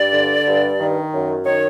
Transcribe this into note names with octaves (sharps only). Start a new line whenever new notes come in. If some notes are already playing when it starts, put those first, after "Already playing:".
Already playing: G2 D5
D3
G2
D#3
F#2
D#3 C#5